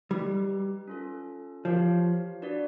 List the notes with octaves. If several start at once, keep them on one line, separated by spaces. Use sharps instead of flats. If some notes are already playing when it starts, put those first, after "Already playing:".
G3 D#4 G4 B4
C#4 F4 A4
F3 G4 A#4 C#5 F5
D4 F#4 B4 D5